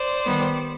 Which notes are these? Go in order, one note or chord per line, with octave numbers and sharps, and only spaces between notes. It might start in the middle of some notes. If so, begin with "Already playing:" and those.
Already playing: C5 D5
D#3 G3 B3